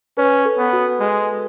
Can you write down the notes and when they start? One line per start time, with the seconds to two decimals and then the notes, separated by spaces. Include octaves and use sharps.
0.17 C#4 B4
0.45 A4
0.59 B3
0.73 F#4
1.00 G#3